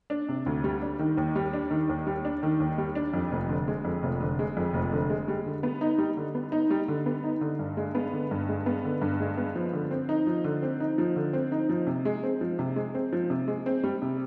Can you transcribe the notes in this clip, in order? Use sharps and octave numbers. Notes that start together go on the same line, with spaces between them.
D4
C3
D2
G3
D4
D#3
D#2
G3
D4
D#3
D#2
G3
D4
D#3
D#2
G3
D4
F2
F1
D3
G#3
F2
F1
D3
G#3
F2
F1
D3
G#3
G3
D3
B3
D#4
G3
D3
B3
D#4
G3
D3
B3
D#4
D3
G2
G#3
B3
D3
G2
G#3
B3
D3
G2
G#3
B3
F3
D3
C4
D#4
F3
D3
C4
D#4
F3
D3
C4
D#4
F3
C3
G#3
C4
F3
C3
G#3
C4
F3
C3
G#3
C4
G3
C3